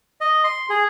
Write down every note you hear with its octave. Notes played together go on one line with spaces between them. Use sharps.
D#5
C6
G#4